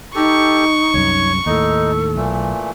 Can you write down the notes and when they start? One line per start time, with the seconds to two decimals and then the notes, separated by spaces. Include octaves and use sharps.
0.15 D#4 G4 A4 C#6
0.94 C2 F#2 C#5
1.46 D#2 A2 D#4 A4
2.16 B1 A#2 E3 A3